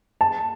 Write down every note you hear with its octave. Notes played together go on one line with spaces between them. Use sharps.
A5